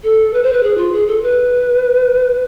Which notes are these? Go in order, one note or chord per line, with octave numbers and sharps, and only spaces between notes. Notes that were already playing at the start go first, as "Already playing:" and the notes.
A4
B4
C5
B4
G#4
F4
G#4
A4
B4